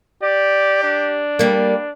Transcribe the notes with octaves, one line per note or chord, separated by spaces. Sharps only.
G4 D5
D4
G3 A#3